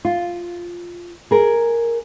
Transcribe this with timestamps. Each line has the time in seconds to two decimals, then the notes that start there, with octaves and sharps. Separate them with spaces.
0.05 F4
1.31 G#4 A#4